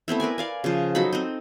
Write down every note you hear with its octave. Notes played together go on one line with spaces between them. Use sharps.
A3 B3 C4 E4
A#4 B4 D5 G#5
D5 F5 G#5
C#3 F3
F#3 D#4 A4 B5
C4 D#4